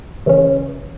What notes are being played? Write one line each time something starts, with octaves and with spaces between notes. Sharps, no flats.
C#3 E3 C#4